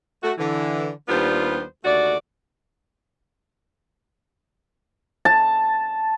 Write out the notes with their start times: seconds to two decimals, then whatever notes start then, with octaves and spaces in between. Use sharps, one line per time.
0.23 A3 F#4
0.37 D3 E3
1.07 D#2 G3 B3 D4 F4 C5
1.83 D#2 D3 A3 F#4 D5
5.25 A5